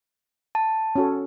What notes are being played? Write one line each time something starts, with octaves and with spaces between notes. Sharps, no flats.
A5
C#4 F#4 A4